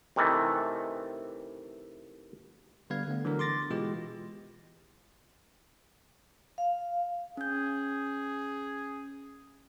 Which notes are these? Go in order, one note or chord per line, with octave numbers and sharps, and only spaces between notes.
C3 D#3 E3 A3
D3 G3 B3 B4 F5 G#6
D3 A3 B3
D3 E3 F#3 D4 A#4
C6 D6 A6 A#6
B2 E3 G#3 F4 G4
F5
C#4 G#4 G6